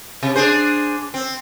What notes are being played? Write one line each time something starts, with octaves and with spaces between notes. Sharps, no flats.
C3
D4 G#4 C5
C4